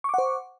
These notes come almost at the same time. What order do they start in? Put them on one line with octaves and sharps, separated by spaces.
C#6 D6 F#5 C5